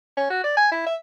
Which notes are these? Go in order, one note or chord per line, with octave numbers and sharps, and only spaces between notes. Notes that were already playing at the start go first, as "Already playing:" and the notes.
C#4
F#4
D5
G#5
E4
E5